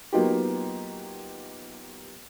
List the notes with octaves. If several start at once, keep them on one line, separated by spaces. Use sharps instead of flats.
F#3 A#3 B3 D#4 F4 G4